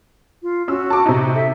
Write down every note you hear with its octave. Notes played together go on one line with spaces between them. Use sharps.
F4
C#4 F#4 E6
A5 D6
C3 D#4
A4 E5